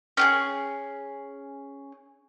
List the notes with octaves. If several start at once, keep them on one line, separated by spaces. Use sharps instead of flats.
C#4 G4 G#4